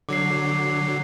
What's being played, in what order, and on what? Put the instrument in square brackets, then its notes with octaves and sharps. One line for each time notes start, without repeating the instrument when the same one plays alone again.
[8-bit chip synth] D3 F#3 [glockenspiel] D6 C7